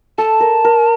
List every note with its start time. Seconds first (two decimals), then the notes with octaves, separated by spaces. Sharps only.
0.18 A4 A5
0.40 A#4
0.65 A#4